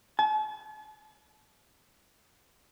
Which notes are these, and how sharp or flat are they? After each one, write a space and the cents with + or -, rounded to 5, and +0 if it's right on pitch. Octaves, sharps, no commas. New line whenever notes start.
A5 -45